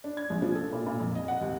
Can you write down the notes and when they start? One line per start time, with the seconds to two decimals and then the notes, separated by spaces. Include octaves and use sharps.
0.04 D4
0.17 G#6
0.30 A#1
0.42 F3
0.55 A4
0.73 A#2
0.86 A#2
1.00 F2
1.15 D#5
1.28 F#5
1.41 D#2